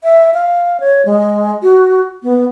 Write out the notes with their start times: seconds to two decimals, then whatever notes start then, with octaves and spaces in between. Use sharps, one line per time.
0.03 E5
0.34 F5
0.80 C#5
1.05 G#3
1.62 F#4
2.23 B3